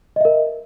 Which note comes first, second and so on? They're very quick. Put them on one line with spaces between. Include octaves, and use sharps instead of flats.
D#5 E5 A#4